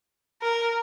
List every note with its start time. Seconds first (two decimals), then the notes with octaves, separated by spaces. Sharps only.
0.42 A#4